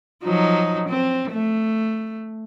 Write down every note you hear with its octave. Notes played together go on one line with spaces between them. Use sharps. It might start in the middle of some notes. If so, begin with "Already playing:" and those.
F3 F#3 D#4
C4
A3